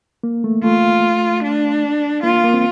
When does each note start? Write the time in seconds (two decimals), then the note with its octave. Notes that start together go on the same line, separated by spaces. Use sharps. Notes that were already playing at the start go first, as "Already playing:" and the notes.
0.23 A#3
0.44 A3
0.64 A3 F4
1.43 D4
2.23 A#3 F4
2.44 A#3
2.54 C4